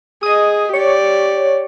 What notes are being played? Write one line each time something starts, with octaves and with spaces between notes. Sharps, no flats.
G#4 D#5 D#6
G4 C#5 D5